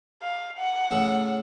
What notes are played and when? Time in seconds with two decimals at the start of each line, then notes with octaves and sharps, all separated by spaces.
0.22 F5
0.58 F#5
0.91 A2 C#3